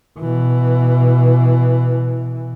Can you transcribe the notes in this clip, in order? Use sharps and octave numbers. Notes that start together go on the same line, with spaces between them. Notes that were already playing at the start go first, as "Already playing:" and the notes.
B2 E3